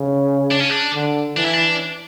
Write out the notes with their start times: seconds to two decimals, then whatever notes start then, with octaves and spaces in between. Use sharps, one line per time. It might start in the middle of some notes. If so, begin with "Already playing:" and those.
Already playing: C#3
0.51 D4
0.60 C#4
0.70 D4
0.94 D3
1.37 E3 D4
1.45 E4
1.53 D4